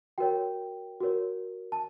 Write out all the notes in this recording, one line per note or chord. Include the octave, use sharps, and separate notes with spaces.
F#4 A#4 C#5 G5
F#4 A#4 C#5
A5